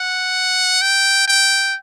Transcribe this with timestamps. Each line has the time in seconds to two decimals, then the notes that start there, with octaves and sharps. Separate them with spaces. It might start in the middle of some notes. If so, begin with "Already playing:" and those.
Already playing: F#5
0.82 G5
1.27 G5